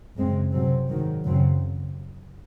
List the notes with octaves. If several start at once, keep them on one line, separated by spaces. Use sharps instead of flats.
F#2 C#3 G#3 C4
C3 F#3 C4
G#2 D#3 F#3
F#2 C#3 F#3 C4